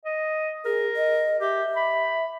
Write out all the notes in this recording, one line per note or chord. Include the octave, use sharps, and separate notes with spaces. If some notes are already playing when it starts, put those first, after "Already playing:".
D#5
G#4 A#4
D#5
G4 E5
B5